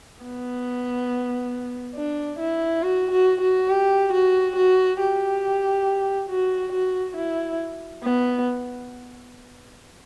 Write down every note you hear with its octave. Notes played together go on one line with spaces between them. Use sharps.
B3
D4
E4
F#4
F#4
F#4
G4
F#4
F#4
G4
F#4
F#4
E4
B3